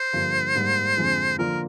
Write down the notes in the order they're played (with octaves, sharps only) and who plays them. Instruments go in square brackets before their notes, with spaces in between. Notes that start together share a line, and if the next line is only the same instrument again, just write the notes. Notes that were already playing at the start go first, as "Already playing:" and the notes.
Already playing: [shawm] C5
[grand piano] G2 D3 F3 A#3
G#2 G3 A#3
F2 D3 F3 G#3
[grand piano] D3 F3 A#3 D4 F4 [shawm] A#4